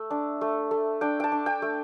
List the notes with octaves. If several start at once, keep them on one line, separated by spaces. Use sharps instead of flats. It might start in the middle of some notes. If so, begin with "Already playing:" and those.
Already playing: A3 E5
D4
A3
A3
D4 G5
G5 A5
D4
G5
A3